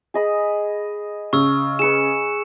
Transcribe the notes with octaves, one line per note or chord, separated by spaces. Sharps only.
G#4 D#5 B5
C#3 C#6 E6
G#4 B4 C#7 E7